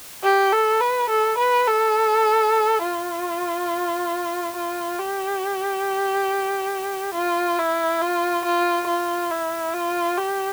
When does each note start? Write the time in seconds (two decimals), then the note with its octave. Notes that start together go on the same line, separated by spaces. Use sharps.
0.24 G4
0.52 A4
0.80 B4
1.10 A4
1.38 B4
1.68 A4
2.83 F4
4.56 F4
4.99 G4
7.14 F4
7.58 E4
8.02 F4
8.45 F4
8.87 F4
9.31 E4
9.74 F4
10.18 G4